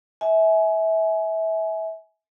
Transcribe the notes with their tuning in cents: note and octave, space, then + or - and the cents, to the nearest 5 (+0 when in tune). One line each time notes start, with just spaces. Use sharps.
E5 -25 G#5 +25